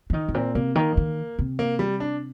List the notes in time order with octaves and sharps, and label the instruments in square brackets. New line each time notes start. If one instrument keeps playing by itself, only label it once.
[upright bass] F3
[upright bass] D#3 [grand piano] D#4
[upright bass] A2
[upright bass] A#2 [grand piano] C4
[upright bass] C3 [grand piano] A#3
[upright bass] D#3 [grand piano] A#3
[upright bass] D#3
C3
[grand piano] A#3
G3
D4